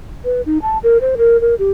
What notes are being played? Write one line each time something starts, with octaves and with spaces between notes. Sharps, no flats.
B4
D#4
A5
A#4
C5
A#4
A#4
G4